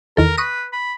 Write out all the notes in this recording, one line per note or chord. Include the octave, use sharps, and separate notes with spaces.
E2 D#3 A4 A#4
B4 C#6 D#6 A#6
B5